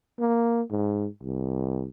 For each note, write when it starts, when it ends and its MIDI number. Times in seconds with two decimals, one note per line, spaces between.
0.19 0.62 58
0.70 1.07 44
1.22 1.87 36